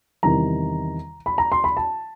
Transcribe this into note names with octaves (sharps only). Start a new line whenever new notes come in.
E2 C3 D#3 G3 A#5
B5
A#5
C6
B5
A5